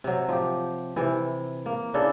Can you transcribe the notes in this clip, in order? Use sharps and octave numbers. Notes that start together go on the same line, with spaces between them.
C3 F#3
F3 G4
C3 E3
A#3
C#3 D4 E4 A4